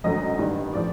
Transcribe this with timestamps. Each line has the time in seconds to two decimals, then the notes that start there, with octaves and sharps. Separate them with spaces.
0.04 G#1 F#2 D3 F#3 A3 D#5
0.39 A1 G2 D#3 G3
0.73 A2 F3 D5